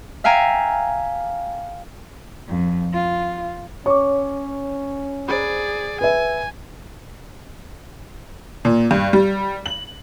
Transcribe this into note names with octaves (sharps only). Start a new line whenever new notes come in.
E5 F5 G5 G#5 A#5
F2
F4
C#4 C#5 C#6 D6
G#4 C5 D5 A#5 B5
B4 E5 G#5
A#2
G2
G3
F#7